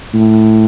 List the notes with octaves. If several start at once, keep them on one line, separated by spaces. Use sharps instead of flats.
A2